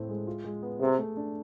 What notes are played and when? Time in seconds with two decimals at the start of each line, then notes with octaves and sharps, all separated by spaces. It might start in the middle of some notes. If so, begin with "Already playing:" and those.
Already playing: A2 A3 C4
0.09 G#3
0.27 F4
0.44 G#3
0.63 B3
0.81 C3 G#4
0.99 A3
1.17 D4